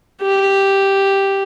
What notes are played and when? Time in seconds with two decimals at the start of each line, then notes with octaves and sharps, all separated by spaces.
0.22 G4